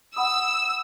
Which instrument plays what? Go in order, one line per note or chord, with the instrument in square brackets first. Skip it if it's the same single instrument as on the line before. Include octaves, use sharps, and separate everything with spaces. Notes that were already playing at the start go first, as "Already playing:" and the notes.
[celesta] F#5 B5 D#6 [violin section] E6